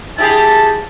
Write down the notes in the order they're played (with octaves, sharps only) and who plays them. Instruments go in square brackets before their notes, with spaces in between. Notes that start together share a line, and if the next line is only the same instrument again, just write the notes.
[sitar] E4 G4 G#4 [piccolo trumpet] A5